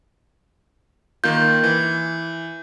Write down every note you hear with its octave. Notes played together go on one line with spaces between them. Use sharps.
D#3 A#3 F4 G6
E3